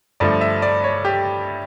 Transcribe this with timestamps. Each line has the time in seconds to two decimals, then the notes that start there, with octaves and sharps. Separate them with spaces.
0.20 G2 D3 F3 A3 D5
0.41 E5
0.62 D5
0.84 C#5
1.05 G4